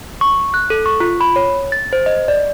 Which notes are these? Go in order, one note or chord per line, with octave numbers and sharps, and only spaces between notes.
C#6
F#6
A4
C#6
F4
B5
C#5
A6
C5
D#5
D5